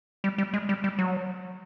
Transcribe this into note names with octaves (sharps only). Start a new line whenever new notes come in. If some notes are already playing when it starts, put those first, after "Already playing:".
G3
G3
G#3
G3
G3
F#3